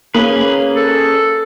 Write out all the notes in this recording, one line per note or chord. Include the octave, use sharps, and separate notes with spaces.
A#3 C#4 G#4 B4
A4